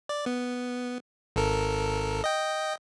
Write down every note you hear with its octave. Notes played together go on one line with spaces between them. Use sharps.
D5
B3
G#1 A4 A#4
D#5 G5